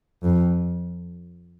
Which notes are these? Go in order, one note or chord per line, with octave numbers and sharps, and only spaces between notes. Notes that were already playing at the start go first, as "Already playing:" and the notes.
F2